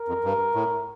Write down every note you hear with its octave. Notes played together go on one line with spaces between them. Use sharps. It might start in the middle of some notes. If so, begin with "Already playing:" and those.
Already playing: A#4
F2
G2
A2